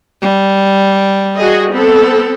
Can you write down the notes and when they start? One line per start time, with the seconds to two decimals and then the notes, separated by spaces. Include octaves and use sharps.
0.22 G3
1.36 F#4 G#4 D#5
1.72 B3 C4 A4